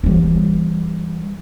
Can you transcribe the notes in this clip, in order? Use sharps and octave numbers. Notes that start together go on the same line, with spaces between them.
E3 G3